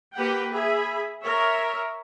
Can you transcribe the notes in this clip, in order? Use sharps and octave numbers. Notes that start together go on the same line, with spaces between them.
A#3 G4 B4 F#5 G5
G#4 E5 B5
A#4 C#5 E5